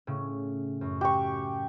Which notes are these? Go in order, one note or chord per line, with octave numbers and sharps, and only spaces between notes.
A2 C#3
F#2
F#4 G4 C#6